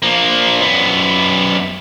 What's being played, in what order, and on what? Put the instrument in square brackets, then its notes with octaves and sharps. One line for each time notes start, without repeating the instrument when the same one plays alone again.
[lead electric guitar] F3 A#3
F#2 B3